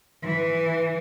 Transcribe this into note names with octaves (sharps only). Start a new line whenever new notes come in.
E3